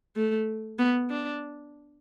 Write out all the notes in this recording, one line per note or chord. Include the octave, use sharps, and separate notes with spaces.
A3
B3
D4